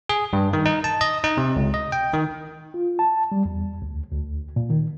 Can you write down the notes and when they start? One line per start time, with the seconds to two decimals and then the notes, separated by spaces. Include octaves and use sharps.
0.09 G#4
0.33 G2
0.53 D#3
0.66 D#4
0.84 A5
1.01 D#5
1.24 D#4
1.37 C3
1.56 C#2
1.74 D#5
1.92 G5
2.13 D#3
2.74 F4
2.99 A5
3.32 G3
3.45 E2
3.82 D2
4.12 D2
4.56 A#2
4.70 D#3